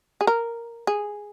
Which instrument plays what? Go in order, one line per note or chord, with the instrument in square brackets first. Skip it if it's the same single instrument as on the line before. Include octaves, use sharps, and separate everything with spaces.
[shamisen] G#4
A#4
G#4